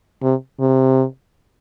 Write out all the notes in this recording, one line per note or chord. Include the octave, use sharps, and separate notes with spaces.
C3
C3